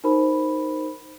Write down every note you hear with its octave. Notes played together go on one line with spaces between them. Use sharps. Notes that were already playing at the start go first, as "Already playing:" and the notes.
D#4 F#4 A#4 C5 B5